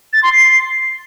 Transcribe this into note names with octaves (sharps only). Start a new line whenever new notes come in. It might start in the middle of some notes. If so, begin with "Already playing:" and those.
A6
C6
C7